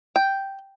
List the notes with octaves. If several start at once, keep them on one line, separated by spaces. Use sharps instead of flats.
G5